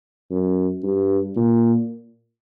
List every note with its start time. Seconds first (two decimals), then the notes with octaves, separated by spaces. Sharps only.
0.31 F#2
0.84 G2
1.36 A#2